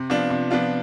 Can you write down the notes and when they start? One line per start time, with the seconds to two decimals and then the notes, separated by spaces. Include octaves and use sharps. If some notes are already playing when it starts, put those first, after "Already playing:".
Already playing: C3
0.10 F3 B3 D4 F4
0.30 C3
0.51 F3 B3 D4 F4